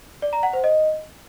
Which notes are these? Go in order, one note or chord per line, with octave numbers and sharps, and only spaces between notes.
D5
A#5
F#5
C5
D#5